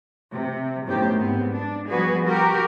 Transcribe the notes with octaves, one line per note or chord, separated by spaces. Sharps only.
C3
F#2 A2 D#3 B3 G4 C5
G#2 B3 C4
D4
F3 G3 B3 F#4 G#4 B4
F#4 G4 A#4